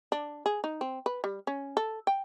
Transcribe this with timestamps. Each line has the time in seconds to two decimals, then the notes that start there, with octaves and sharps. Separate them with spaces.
0.12 D4
0.46 G#4
0.64 D#4
0.81 C4
1.06 B4
1.24 G3
1.47 C#4
1.77 A4
2.07 G5